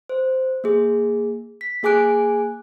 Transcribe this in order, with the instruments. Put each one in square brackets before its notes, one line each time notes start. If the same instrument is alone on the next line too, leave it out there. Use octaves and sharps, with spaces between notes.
[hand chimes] C5
A#3 G#4
B6
A#3 G#4 G#5 D6 F#6 D7